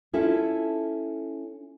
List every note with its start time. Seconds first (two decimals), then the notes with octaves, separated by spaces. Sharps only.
0.13 C#4 E4 F4 A4